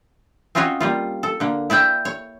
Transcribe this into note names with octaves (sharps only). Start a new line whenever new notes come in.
C4 C#4 F4 F#4 C#5 D#5
G3 A#3 F4
A4
D3 A#3
E4 D5 E5 G5
C#5